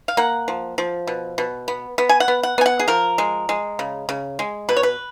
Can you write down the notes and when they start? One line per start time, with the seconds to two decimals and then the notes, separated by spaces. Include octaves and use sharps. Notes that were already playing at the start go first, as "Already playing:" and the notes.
0.08 F5
0.17 A#3 F#5
0.48 F3
0.78 F3
1.07 B2
1.38 B2
1.68 B3
1.98 B3
2.09 G#5
2.20 F#5
2.28 B3
2.43 F#5
2.58 B3 G#5
2.66 F#5
2.79 G#4
2.88 F3 A#4
3.18 G#3
3.49 G#3
3.79 C#3
4.09 C#3
4.39 G#3
4.69 B2 B4
4.77 C#5
4.83 B4